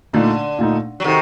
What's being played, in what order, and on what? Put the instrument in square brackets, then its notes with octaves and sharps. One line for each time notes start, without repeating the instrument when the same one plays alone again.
[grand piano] A#2 A3 D#4 [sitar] D3
[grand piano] A#2 A3 D#4
[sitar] F#3
[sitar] C3 D#3 [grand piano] D#4 F#4 A4